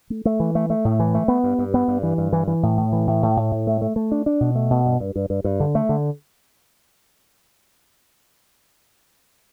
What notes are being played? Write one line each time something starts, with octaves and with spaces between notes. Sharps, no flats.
A3
A3
E3
A3
A3
A2
E3
A3
B3
G2
G2
B3
G2
E3
G2
E3
E3
A2
A2
E3
A2
A2
A2
A2
A3
A3
A3
D4
D4
B2
A3
B2
G2
G2
G2
G2
G2
D3
A3
D3